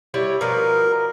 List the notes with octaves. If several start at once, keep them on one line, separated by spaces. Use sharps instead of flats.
G3 E4 C#5
B2 F3 A#4 D5